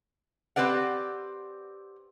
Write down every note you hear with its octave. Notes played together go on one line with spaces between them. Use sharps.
C4 G4 B4 D5 F#5